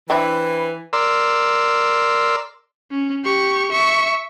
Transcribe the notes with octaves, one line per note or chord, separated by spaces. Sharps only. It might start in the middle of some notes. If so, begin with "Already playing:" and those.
E3 C4 D4 E4 B5
A#4 D5 C6 E6
C#4
G4 C#6
E5 C#6